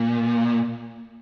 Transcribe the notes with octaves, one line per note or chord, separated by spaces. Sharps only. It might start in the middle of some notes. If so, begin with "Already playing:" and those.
Already playing: A#2